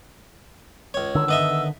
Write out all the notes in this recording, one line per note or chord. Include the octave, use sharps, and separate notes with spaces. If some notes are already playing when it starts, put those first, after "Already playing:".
C#2 C#5
D3 D#3 E6
B3 D#5 E5